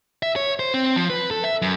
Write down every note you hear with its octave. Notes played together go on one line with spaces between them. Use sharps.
E5
C#5
C5
C4
F3
B4
A4
E5
F#2